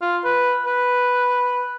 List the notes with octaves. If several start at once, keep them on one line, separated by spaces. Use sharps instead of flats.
F4
B4
B4